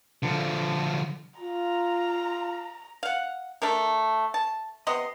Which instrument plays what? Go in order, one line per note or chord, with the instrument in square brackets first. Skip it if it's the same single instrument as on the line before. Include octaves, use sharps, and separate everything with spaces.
[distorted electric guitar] D3 F3
[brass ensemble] F4 [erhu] A#5
[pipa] F5 F#5
A3 D4 A#4
A5
C3 B3 D#5 C6